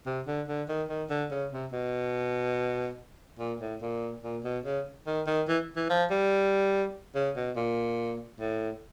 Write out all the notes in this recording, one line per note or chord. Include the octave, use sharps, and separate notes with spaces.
C3
D3
D3
D#3
D#3
D3
C#3
C3
B2
A#2
A2
A#2
A#2
B2
C#3
D#3
D#3
E3
E3
F3
G3
C#3
B2
A#2
A2